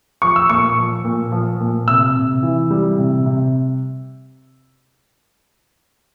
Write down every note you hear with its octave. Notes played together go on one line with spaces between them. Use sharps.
F3 C#6
E6
A#2 C#6
F3
A#2
F3
A#2
C3 E6
C3
E3
G3
C3
C3